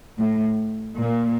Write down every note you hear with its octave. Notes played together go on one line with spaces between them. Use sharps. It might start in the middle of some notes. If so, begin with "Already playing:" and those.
A2
A#2